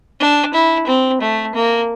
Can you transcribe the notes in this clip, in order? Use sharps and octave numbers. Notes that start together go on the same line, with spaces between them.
D4
E4
C4
A3
A#3